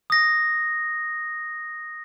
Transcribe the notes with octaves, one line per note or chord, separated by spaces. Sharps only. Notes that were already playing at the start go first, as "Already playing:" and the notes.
D#6 A#6